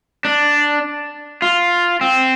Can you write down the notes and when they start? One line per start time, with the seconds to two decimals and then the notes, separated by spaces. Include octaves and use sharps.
0.25 D4
1.42 F4
2.01 C4